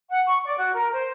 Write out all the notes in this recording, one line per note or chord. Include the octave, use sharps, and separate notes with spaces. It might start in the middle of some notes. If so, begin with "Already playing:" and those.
F#5
C#6
D5
F#4
A#4
C5